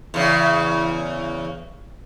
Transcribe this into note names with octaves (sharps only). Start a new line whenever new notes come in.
E2 C#3